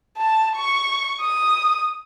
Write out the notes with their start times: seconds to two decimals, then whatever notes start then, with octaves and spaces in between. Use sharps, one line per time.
0.17 A5
0.56 C#6
1.21 D#6